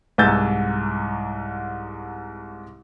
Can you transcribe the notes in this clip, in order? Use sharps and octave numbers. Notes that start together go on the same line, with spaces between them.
C2 G#2 G#5 E6 G6 A6